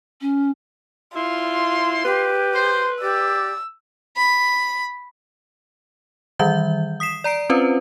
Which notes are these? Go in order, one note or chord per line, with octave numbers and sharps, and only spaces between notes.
C#4
E4 F4 C6
G4 B4
C5 C6
G4 D5 E6
B5
D#3 E3 G3 E5 G6
D#6 B6 C7 E7
D5 A#5 C7 D7
C4 C#4 F4 B4 C5